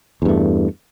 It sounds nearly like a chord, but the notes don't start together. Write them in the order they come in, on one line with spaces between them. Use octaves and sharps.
E2 G2 A3